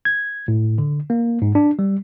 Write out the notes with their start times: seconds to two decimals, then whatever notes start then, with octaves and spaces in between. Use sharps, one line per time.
0.05 G#6
0.48 A2
0.78 D3
1.10 A#3
1.42 G#2
1.55 D4
1.79 G3